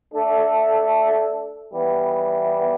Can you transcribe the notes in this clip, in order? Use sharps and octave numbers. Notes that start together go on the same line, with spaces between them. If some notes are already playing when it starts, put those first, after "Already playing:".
A3 D4 A4
E3 G3 B3